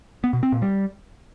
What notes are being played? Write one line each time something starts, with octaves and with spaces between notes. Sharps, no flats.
B3
B2
C4
A#2
G3